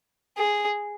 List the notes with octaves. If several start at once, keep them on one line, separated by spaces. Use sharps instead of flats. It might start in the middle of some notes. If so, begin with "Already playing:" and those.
G#4